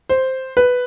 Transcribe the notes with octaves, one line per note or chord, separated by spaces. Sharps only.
C5
B4